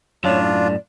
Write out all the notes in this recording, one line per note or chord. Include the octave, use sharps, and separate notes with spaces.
F#2 A2 D4 F4 C#5
D5